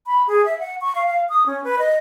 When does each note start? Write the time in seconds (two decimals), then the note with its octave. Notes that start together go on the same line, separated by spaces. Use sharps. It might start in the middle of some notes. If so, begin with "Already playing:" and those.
0.07 B5
0.27 G#4
0.45 E5
0.59 F#5
0.81 C#6
0.95 F5
1.07 F5
1.29 D#6
1.46 C#4
1.64 B4
1.79 D#5